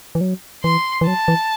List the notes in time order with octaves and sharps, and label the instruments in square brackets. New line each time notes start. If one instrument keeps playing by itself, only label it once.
[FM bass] E3
F#3
[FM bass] E3 [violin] C6
[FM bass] E3
[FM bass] F#3 [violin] A5
[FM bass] E3